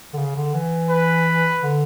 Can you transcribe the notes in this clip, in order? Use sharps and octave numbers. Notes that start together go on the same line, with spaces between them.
D3
C#3
D3
E3
B4
D3